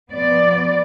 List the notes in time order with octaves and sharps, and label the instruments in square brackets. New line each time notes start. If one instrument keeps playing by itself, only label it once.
[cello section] F3 B3 D5